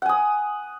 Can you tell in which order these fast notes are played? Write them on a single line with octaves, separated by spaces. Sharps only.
F#5 G#5 D#6